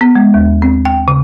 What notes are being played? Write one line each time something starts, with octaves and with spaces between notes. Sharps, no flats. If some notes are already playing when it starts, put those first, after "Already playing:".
B3
G#3
D#2
C4
G5
C#3